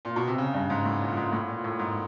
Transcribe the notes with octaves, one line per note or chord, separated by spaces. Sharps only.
A#2
B2
C3
C#3
G2
G#2
A2
A#2
G#2
A2
A#2
A2
G#2